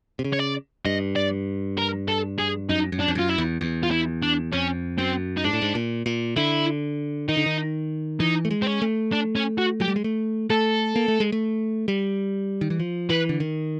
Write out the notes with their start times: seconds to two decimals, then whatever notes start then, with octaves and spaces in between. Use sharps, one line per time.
0.19 C3
0.25 C#3
0.33 C#5
0.39 D5
0.85 G2 D#5
1.16 D5
1.78 A#4
2.08 A4
2.38 G#4
2.69 F#2 D#4
2.92 F#2
3.00 D4
3.08 F2
3.15 F#2 F4
3.30 E4
3.38 E2
3.61 E2
3.83 F4
3.91 E4
4.23 D4
4.53 F2 C#4
4.98 F#2 C4
5.37 D#4
5.44 G#2 D4
5.53 A2
5.62 G#2
5.75 A#2
6.06 A#2
6.36 D3 E4
7.28 D#3 D#4
7.37 D3
7.46 D#3
8.20 E3 D#4
8.45 A3
8.51 G#3
8.62 C4
8.67 C#4
8.82 A3
9.12 D4
9.36 C#4
9.58 F#4
9.80 F#3 G4
9.88 G3
9.96 G#3
10.04 A3
10.50 A3 A4
10.96 A#3
11.08 A3
11.20 G#3
11.32 A3
11.88 G3
12.61 D#3
12.70 E3
12.80 F3
13.10 E3 B4
13.29 D3
13.40 D#3